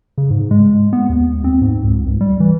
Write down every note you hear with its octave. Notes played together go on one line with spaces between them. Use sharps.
C#3
G#2
G#3
B3
D#2
C4
G#2
C#2
C#2
G3
E3